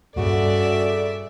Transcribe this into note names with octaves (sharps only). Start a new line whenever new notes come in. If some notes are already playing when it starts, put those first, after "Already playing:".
G2 A#2 C#3 F#4 A4 D5 E5